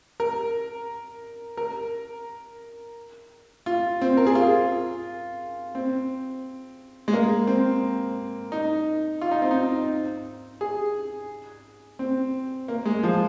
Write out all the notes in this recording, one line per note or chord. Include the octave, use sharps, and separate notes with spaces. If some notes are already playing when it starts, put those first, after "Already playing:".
A#4
A#4
F4
C4
A#4
G#4
F4
C4
G#3
A#3
C4
D#4
F4
D#4
C4
D#4
G#4
C4
A#3
G#3
F3